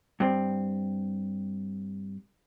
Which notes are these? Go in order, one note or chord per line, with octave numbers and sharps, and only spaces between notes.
G2 C4